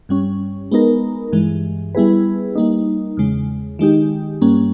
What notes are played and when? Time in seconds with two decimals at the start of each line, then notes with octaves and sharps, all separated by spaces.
0.09 G2 G3 C#4
0.71 G#3 B3 D#4 A#4
1.32 G2 E3 G#3
1.95 G3 B3 E4 G#4 B4
2.56 G3 A#3 D#4
3.17 E2 C#3 G#3
3.79 D#3 G#3 D#4 G4
4.41 G2 G3 A#3 C#4